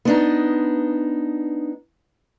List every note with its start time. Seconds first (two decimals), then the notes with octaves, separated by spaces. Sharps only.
0.05 B3 D4 D#4